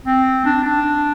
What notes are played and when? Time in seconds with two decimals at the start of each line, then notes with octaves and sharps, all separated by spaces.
0.05 C4
0.45 D4
0.65 D4